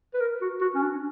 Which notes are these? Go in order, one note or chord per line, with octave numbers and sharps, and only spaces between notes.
B4
A#4
F#4
F#4
C#4
D4